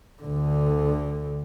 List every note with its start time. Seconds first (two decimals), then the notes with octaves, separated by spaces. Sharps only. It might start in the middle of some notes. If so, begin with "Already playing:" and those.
0.22 D2 D3